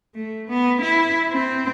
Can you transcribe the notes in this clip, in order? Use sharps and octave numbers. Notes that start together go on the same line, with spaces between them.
A3
B3
E4
C4